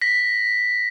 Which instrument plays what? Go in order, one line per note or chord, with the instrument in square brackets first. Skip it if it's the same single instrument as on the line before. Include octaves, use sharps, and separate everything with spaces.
[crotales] A#6 B6